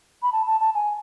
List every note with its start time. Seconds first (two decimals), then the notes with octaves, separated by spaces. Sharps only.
0.23 B5
0.33 A5
0.47 A5
0.61 A5
0.75 G#5